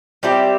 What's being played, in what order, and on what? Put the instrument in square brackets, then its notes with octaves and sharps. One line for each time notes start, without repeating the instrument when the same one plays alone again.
[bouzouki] G3 C4 E4 G4